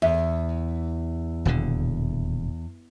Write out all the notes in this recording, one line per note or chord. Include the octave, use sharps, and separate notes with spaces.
E2 E5
D#1 B2 D3